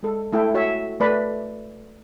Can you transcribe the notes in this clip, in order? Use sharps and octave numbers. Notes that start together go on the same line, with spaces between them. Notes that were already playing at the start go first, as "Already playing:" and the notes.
G#3 A4
A3 E4 A4 G5
F#4 C#5 E5
A3 B4 D5 B5